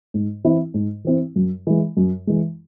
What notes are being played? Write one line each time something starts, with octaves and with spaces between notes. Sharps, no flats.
G#2
E3 C4 E4
G#2
E3 C4 E4
F#2
E3 G#3
F#2
E3 G#3